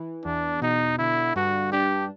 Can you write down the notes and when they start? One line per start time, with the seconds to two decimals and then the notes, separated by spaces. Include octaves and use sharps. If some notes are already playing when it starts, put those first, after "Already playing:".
Already playing: E3
0.25 E2 D4
0.62 B2 D#4
0.99 D3 E4
1.36 G2 F#4
1.72 D4 G4